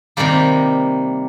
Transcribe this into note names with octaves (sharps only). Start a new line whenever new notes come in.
C3 D#3 G3 A#3